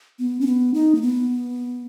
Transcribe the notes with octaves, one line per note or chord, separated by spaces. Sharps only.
B3
C#4
B3
D#4
A#3
B3